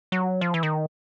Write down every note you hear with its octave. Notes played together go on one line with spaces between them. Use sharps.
F#3
F3
E3
D#3